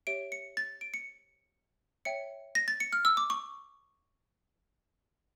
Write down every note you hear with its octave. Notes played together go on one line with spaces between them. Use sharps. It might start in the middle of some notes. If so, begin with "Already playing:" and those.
G4 C#5 E5 D7
C#7
A6
D7
C#7
C#5 E5 G5 C#7
A#6
A6
C#7
F6
E6
D6
C#6